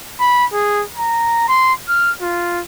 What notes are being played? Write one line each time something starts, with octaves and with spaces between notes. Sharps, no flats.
B5
G#4
A#5
C6
F6
F4